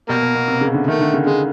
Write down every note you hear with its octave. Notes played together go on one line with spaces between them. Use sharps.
B2 G3 A#3
B2
B2
C3
C#3
D3
D#3 A3
D3
C#3
C#3 G#3